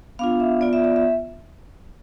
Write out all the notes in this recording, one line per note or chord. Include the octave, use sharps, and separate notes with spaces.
B3 D4 F4 F5
E5
B3 F4 D5
E5
D5
E5